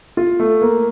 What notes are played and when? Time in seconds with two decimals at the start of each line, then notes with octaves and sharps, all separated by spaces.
0.17 F4
0.40 A3
0.62 A#3